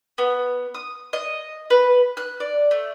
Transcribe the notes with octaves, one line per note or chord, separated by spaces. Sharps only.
B3
D#6
D#5
B4
F#6
D5
A3